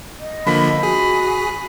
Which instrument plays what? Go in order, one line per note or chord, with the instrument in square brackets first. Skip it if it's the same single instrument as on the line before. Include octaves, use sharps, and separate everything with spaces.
[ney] D#5
[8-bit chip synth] D3 F3 A#3 [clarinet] B5
[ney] F#4 [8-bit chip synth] G#4